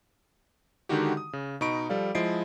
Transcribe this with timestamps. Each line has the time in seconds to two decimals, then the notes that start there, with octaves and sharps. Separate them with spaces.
0.89 D3 D#3 G#3 D#4 F#4 G4
1.17 D#6
1.33 C#3
1.61 B2 D#4 A#5 B5 C#6 D7
1.89 F3 G3 A4 D5 F5
2.15 F3 G#3 E4 D#5 C7 D7